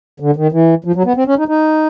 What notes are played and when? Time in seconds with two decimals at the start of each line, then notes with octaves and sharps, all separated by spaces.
0.20 D3
0.36 D#3
0.52 E3
0.85 F3
0.95 F#3
1.05 B3
1.16 C4
1.27 C#4
1.38 D#4
1.48 D#4